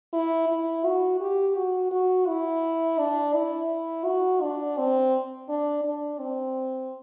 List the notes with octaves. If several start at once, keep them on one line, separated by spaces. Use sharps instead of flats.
E4
E4
F#4
G4
F#4
F#4
E4
D4
E4
F#4
D4
C4
D4
D4
C4